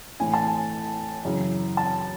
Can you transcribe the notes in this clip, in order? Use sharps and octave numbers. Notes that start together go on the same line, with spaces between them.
A2 E3 G#5
A5
G#5
F#2 C#3 E3
A5